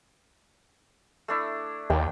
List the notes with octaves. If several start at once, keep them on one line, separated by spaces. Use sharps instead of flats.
A3 D4 E4
D#2 G5